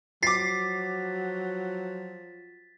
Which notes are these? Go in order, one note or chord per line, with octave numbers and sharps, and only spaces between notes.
F3 F#3 D6 A6 B6 C7